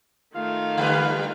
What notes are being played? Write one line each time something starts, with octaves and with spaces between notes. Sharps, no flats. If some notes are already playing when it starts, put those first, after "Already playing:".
D#3 A3 F4 F5
D3 G3 B4